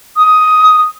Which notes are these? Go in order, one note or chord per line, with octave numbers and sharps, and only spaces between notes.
D#6